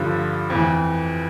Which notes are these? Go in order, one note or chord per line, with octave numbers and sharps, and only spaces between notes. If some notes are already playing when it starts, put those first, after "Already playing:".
Already playing: G2 D3 F3
F2 E3